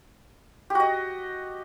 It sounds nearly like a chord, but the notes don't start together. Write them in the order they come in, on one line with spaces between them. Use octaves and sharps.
G4 F#4 D#5